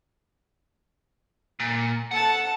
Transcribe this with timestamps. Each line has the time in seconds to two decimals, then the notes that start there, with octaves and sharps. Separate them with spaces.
1.60 A#2
2.11 A4 F#5 A5